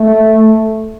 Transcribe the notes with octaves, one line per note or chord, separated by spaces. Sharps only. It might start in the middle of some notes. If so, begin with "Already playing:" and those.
Already playing: A3